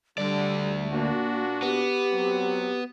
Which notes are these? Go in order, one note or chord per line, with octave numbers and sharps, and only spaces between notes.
D2 D3 G3 D5
A#2 A#3 D4 F#4
B3 G4
F#3 C4